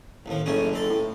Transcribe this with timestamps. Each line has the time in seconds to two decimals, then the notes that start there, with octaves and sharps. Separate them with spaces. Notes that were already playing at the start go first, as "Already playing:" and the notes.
0.26 A1 D#2 F3
0.46 F#1 A3 C#4 G#4
0.73 C4 A4
0.89 A2